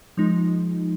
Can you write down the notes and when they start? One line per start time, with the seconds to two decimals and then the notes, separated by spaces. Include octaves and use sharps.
0.17 F3 G#3 D#4